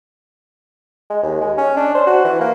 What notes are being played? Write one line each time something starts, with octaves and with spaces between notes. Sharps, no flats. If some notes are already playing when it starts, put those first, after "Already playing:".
G#3
D#2
G#3
C#4
D4
C5
F#4
E3
A#3